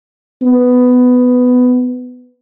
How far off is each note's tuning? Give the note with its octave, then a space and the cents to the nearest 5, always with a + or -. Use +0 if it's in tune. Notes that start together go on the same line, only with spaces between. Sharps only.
B3 +10